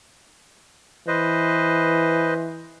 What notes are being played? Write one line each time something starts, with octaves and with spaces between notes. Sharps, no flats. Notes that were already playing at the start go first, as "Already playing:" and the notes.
E3 B4 C5 D#5